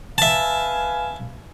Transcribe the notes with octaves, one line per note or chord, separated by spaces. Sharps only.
B4 E5 F5 G#5 A5